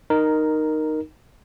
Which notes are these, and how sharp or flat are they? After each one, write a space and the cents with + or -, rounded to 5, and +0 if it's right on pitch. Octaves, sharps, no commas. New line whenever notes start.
D#4 -10 A#4 +0